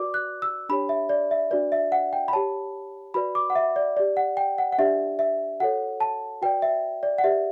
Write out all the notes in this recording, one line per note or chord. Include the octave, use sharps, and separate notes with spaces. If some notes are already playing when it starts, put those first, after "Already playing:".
Already playing: F#4 B4 D5 D6
F#6
E6
D4 G4 C#5 B5
E5
D5
E5
D4 F#4 B4 D5
E5
F#5
G5
B5
G4 C#5 A5
F#4 B4 D5 B5
D6
F#5
E5
D5
G4 D5
F#5
G5
F#5
F#5
D4 G4 D5 E5
E5
F#4 A4 C#5 F#5
A5
F#4 B4 D5 G5
E5
D5
F#5
G4 B4 D5 E5